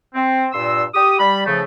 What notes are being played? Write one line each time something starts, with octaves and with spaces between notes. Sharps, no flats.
C4
G2 A#2 C6 E6
G4 D#6
G3 B5
C#3 F3 A3